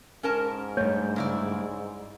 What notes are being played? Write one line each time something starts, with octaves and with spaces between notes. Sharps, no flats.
G#2 C#4 A#4 A5
G2 A3 C#5
C#3 E4 D5